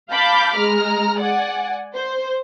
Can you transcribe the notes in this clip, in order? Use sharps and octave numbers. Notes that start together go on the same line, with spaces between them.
F5 A5 B5 D6 G6
G#3 A#5 F6
D5 F#5 G#5
C5